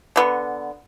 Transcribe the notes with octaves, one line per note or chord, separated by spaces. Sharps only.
D3 B3